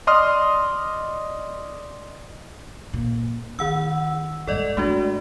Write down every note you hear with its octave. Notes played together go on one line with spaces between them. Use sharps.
D5 D#5 C6 D#6 F6
A#2
D#3 E4 F#5 E6
G#2 G3 A4 D5 D#5
G#3 A3 D4 F#4